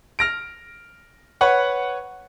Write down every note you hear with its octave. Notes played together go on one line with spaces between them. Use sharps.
F6 A#6 D7
B4 C#5 F#5 C#6